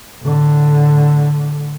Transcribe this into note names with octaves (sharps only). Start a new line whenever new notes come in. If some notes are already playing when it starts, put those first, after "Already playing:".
A2 D3